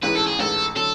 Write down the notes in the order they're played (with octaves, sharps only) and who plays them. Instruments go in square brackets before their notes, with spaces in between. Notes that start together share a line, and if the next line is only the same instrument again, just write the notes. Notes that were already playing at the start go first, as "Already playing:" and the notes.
[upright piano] A1 G#2 E3 [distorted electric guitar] B4
[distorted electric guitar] A4
G#4
[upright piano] A1 G#2 E3 [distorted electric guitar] A4
[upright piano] D3 F#3 [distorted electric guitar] A4